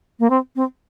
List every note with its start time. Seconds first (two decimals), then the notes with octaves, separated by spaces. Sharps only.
0.20 A#3
0.30 C4
0.56 C4